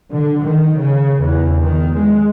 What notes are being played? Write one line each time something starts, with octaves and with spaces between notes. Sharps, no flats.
D3
D#3
C#3
E2
D#3
G#3